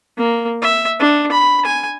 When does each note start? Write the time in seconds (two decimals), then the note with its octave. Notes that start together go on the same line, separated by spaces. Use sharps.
0.17 A#3
0.62 E5
1.00 D4
1.32 B5
1.65 G#5